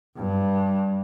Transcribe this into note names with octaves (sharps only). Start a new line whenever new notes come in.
G2